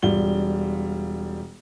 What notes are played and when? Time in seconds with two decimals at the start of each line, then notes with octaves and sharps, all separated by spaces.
0.02 E1 G3 F4 G7